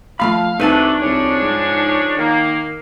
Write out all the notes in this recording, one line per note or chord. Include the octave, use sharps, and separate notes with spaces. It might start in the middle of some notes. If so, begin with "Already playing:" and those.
F3 A3 F5 B5
C2 F#3 A3 D4 D#4 B4 G#5 A5
C2 F3 G#4 C#5
G#2
D#3 A#3